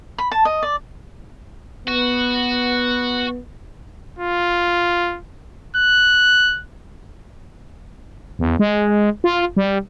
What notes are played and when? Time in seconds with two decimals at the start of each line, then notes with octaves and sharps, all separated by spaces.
0.18 B5
0.32 A5
0.45 D#5
0.63 D5
1.87 B3 F#4
4.19 F4
5.76 F#6
8.39 E2
8.59 G#3
9.24 F4
9.57 G3